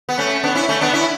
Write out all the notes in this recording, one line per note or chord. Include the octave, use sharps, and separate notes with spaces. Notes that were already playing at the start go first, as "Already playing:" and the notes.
B3
A3 C#4
B3 D4
C#4 E4
A3 C#4
B3 D4
C#4 E4